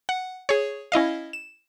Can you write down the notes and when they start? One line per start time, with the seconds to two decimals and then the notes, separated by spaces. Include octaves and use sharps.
0.09 F#5
0.49 G#4 C#5
0.92 C#4 E4 D#5 F5
1.33 E7